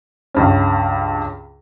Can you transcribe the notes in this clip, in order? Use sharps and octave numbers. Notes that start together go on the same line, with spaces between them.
C#2 G2 C#4